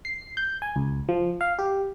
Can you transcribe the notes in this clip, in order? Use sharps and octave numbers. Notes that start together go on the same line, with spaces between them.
C7
G6
G#5
C#2
F3
F5
G4